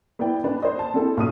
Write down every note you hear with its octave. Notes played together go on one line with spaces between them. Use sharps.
B3 E4 B4 D5 G5
C#4 D4 B4 D5
C5 D#5
A5
C4 D4 E4 G#4 A4
B1 A#2 C#4 A5 D#6 D#7